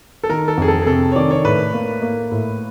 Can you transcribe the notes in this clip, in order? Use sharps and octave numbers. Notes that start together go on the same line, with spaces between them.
A4
D#3 A#4
A4
F2 G#4
A4
G#4
C3 A4
C#5
D#3 D5
C#5
A2 B4
A#3
A#3
A2